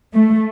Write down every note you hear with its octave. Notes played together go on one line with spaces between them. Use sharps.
A3